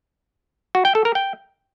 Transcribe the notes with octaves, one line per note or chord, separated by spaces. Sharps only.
F#4
G5
A4
A#4
G5